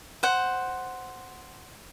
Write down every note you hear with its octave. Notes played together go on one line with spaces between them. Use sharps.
C5 F#5